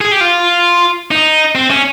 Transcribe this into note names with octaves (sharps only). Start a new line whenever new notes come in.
G#4
G4
F4
D#4
C4
C#4